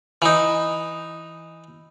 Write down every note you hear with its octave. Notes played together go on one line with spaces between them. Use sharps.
E3 D#4